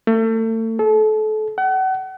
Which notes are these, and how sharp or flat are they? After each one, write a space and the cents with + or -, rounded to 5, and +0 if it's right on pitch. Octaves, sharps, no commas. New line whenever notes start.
A3 +35
A4 -30
F#5 +35